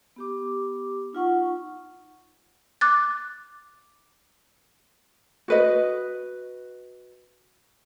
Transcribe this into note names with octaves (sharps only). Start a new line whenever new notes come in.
B3 G4 D6
D#4 F4 F#5 C#6
D6 F#6 A6
F#4 B4 D#5